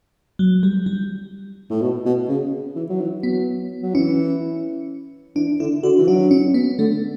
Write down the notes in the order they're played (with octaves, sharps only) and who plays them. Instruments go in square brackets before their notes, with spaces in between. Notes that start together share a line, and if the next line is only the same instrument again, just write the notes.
[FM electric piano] F#3
G3
G3
[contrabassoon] A2
B2
B2
C#3
E3
F#3
E3
[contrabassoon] F#3 [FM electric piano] B3
[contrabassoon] F#3
[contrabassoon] E3 [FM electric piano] C#4
[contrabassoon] E3 [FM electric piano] D4
[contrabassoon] D3 [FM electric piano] E4
[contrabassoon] D3 [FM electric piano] F#4
[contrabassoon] E3
[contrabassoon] F#3 [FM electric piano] D4
[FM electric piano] C#4
B3
[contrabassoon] D3 [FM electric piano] A3